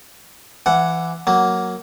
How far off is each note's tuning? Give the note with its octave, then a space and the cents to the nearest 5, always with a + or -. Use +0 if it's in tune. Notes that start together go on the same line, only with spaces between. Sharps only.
E3 +20 F#5 +0
F#3 +0 A#3 +0